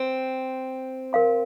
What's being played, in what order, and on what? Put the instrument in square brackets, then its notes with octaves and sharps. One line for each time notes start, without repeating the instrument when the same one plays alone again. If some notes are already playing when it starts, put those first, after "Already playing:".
Already playing: [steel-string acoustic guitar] C4
[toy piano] A#4 F5 C6